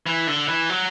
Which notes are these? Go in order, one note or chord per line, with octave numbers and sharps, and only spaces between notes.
E3
D3
E3
F#3